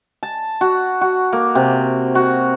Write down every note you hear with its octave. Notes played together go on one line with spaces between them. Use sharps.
A5
F#4
F#4
A#3
C3
F#4